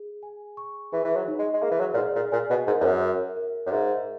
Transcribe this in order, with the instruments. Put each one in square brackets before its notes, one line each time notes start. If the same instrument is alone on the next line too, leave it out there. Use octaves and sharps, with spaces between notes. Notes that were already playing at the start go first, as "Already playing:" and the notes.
Already playing: [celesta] G#4
G#5
C#6
[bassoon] E3 [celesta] G#4
[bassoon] E3
F#3
[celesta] D#4
[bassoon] G#3
G#3
[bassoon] A#3 [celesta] G#4
[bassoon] E3
F#3
A#2
[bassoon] G#2 [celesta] G#4
[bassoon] A#2
[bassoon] A#2 [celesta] G#5
[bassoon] B2
[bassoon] G#2 [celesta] A#4
[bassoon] E2
F#2
[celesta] E5
A#4
[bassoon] F#2
[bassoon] G#2 [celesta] E5